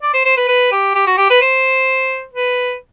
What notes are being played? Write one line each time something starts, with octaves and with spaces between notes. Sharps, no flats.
D5
C5
C5
B4
B4
G4
G4
F#4
G4
B4
C5
B4